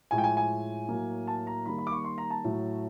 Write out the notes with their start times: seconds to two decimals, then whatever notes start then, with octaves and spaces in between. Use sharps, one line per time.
0.11 A2 F3 G#3 G#5
0.18 G5
0.24 G#5
0.37 G#5
0.89 A2 F#3 A#3
1.27 A5
1.47 A#5
1.65 D#3 G3 A#3 B5
1.78 B5
1.87 D6
1.92 C#6
2.04 C6
2.18 A#5
2.30 A5
2.44 A2 F#3 A3